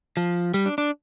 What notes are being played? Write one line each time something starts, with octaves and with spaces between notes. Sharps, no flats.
F3
G3
D4
D4